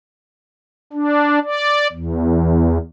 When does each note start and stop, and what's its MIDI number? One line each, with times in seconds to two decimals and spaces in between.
0.93 1.39 62
1.45 1.88 74
1.92 2.78 40